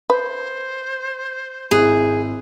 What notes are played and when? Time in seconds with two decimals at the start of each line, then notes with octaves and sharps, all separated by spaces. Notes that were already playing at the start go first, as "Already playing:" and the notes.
0.10 B4 C5
1.71 G#1 E4 G#4 F#6